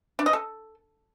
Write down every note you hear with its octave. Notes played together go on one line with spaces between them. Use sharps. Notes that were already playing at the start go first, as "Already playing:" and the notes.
D4
D#5
A4